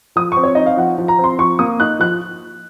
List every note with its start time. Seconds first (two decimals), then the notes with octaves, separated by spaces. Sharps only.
0.16 F3 D#6
0.32 C#6
0.37 C4
0.43 C#5
0.55 D#4 D#5
0.66 F5
0.77 F3 F#5
0.98 F3
1.08 A#5
1.19 C4
1.24 C6
1.39 F3 C#6
1.59 A#3 D#6
1.80 D#4 F#6
1.99 F3 F#6